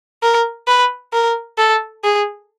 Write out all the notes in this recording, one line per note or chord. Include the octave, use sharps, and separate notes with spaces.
A#4
B4
A#4
A4
G#4